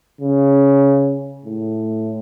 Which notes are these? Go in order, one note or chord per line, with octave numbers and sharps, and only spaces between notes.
C#3
A2